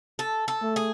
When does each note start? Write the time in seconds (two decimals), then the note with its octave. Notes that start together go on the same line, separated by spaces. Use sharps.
0.19 A4
0.48 A4
0.62 A3
0.76 G#4